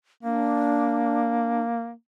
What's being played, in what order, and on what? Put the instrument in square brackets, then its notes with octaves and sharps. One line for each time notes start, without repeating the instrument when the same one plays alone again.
[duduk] A#3 [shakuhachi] D4